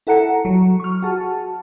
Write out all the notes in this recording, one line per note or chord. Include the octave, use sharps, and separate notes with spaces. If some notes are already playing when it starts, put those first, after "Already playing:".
E4 A4 F#5 A#5 C#7
F#3
C#6 F6
F#4 G#4 A5